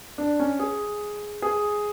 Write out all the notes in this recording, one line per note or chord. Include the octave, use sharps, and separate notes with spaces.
D4
C#4
G#4
G#4